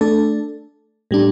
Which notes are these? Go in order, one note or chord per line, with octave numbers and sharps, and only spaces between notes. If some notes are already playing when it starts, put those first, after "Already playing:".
A3 D4 A4
A2 G3 D4